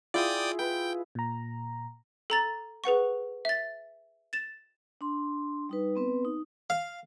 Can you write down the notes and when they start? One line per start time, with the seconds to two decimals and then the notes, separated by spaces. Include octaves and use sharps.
0.14 E4 F4 G#4 D5 G5 D#6
0.59 B4 G5
1.15 A#2 A#5
2.30 A4 A#5 A6
2.84 G#4 B4 F#5 C#6
3.45 E5 A6
4.33 A6 E7
5.01 D4 C6
5.69 G3 D#4 B4
5.95 B3 C4 B4
6.25 D#4
6.70 F5